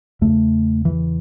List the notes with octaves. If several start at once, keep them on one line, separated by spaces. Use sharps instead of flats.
E2 C#3 A3
E3